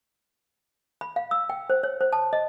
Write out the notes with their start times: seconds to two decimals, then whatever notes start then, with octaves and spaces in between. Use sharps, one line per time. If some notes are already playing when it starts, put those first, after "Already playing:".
1.01 B5
1.16 F5
1.31 E6
1.50 G5
1.70 C5
1.83 C#5
2.01 C5
2.13 A5
2.33 D#5